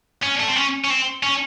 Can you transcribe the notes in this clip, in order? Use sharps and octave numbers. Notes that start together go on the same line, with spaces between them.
C#4
A3
C4
C#4
C#4
C4
C#4